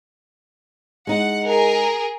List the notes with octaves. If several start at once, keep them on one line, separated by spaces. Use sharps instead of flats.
G#3 D#4 F#5
G#4 A#4